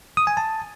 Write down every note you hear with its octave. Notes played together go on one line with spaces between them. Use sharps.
D#6
G#5
A5